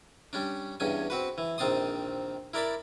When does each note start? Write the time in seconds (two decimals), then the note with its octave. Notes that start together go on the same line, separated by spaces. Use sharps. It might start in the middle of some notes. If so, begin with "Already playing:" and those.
0.33 G3 C#4 D4
0.80 E2 G2 C#4 G#5
1.10 C4 F#4 B4
1.38 E3
1.58 A#1 D#3 C4 A5 C6 D#6
2.54 E4 A#4 D5 A5 B5